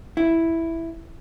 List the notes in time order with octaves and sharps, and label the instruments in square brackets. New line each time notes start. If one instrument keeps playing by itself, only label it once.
[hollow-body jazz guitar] E4